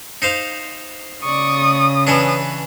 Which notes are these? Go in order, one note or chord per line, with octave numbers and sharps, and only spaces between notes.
D#4 C5 F5
C#3 D5 C#6 D#6
E3 C#4 D4 B4